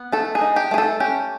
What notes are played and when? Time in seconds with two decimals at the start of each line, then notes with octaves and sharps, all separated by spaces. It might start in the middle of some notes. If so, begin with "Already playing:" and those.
Already playing: B3
0.12 A3 A4
0.35 G#4
0.41 D#4
0.56 G4
0.71 A3 G#4
0.78 A4
1.00 C#4 G4